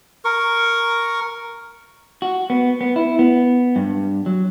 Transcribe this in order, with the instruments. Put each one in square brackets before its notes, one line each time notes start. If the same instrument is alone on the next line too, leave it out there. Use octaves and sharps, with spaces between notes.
[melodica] A#4 C#6
[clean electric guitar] F#4
B3
B3
E4
B3
G2
F#3